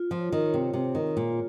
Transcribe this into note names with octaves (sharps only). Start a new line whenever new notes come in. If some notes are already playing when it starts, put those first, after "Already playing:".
Already playing: F4
F3
C#5
D#3
C#5
C3
C3 F4
D#3
G#4
A#2
F4